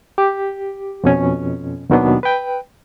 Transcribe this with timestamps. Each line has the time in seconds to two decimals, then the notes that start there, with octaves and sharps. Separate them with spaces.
0.18 G4
1.04 F2 B2 C#4
1.90 D#2 B2 D#3 F#3 B3 D4
2.23 B4 G5